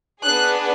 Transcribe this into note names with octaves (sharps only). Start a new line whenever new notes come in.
B3 D4 G#4 F#6